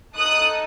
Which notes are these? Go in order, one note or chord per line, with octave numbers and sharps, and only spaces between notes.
D#4 A4 D#6 F#6